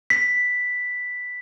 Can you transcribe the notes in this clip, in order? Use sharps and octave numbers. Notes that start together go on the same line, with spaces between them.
B6